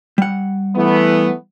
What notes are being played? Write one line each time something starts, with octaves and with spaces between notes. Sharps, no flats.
G3 F#5
E3 A3 B3